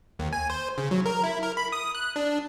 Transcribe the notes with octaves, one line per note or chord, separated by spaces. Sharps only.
D#2
G#5
C5
C#3
F#3
A#4
E4
A#4
B5
D#6
F#6
D4